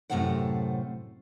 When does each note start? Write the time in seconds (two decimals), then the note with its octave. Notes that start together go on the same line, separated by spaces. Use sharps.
0.10 F#2 A2 C3 A4 C5 F#5